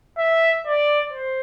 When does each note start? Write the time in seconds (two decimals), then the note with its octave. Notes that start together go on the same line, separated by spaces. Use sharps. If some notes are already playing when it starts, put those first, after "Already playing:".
0.18 E5
0.67 D5
1.13 C5